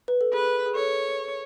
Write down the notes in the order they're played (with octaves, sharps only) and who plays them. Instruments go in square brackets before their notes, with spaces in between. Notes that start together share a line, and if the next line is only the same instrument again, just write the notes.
[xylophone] B4
A4
[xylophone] G#4 [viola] B4
[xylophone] G#4
[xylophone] A4 [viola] C#5